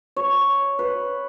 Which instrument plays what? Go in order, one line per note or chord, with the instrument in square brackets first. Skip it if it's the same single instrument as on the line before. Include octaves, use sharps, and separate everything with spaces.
[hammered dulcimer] C#5
B4